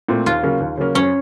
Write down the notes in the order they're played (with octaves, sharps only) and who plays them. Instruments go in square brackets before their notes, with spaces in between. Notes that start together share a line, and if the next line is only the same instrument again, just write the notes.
[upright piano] A#2 A3 C4
[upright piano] D#2 [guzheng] F4
[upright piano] C#3 F#3 A#3 C#4
D#2
C#3 F#3 A#3 C#4
[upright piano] F#2 [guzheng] C#4